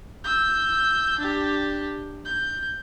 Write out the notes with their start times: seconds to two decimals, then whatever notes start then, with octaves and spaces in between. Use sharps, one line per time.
0.24 E6 G6
1.19 D4 G4
2.25 G6